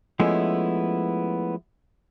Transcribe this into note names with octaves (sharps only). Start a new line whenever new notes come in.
F3 G#3 A3 B3 C#4 E4